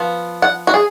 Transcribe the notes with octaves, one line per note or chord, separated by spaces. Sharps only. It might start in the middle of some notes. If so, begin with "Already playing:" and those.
Already playing: F3 B3
F#5
F#4
G#4